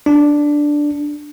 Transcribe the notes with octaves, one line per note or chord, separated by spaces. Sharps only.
D4